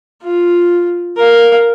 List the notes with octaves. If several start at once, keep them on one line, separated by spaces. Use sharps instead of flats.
F4
A#4 F5